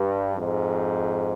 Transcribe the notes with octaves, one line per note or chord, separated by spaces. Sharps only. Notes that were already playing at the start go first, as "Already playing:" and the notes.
Already playing: G2
F2 G#2